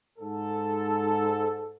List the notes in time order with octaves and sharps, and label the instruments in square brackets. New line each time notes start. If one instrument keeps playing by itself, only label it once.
[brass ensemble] G#2 A4